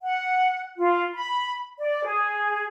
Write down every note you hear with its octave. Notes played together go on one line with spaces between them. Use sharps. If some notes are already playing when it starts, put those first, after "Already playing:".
F#5
F4
B5
D5
G#4